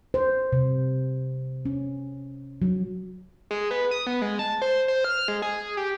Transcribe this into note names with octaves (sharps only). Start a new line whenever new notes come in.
C5
C3
C#4
F#3
G#3
B3
D#6
B3
G#3
A5
C5
C5
F6
G#3
G#4
G4